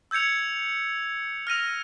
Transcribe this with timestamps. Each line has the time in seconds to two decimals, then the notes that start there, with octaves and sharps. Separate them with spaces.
0.11 E6 G6 G#6 C#7 F7
1.47 F6 A#6 D#7 F7